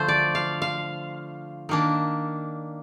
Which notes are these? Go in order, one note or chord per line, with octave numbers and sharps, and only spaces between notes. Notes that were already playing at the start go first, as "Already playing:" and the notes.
Already playing: D3 F3 A3 D4 C5
D5
F5
F5
D#3 A#3 D4